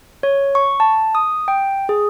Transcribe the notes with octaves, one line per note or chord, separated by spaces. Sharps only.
C#5
C#6
A5
D#6
G5
G#4